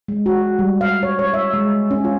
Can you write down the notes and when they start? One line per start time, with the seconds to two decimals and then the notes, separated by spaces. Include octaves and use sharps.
0.08 G#3
0.26 F#4
0.59 G3
0.81 F5
1.03 C#5
1.19 C#5
1.34 E5
1.54 G#3
1.91 C#4
2.04 F4